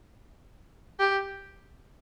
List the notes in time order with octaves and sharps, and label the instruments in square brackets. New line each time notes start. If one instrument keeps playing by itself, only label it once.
[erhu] G4